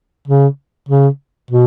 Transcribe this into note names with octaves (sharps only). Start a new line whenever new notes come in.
C#3
C#3
B2